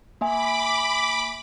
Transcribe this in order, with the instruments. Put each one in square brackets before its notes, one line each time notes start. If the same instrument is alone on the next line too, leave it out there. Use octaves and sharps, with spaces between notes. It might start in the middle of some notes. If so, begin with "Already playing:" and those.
[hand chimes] A#3 E5 G#5 [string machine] B5 D6